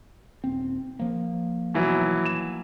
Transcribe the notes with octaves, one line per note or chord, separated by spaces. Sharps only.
D#1 C4
F3 A#3
B2 E3 F#3
E7